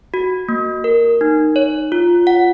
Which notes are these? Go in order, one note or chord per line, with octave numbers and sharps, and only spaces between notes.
F#4
A#3
A#4
D#4
C#5
F4
F#5